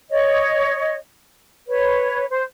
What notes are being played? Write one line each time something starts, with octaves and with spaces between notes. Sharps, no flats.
C#5 D#5
B4 C#5
C5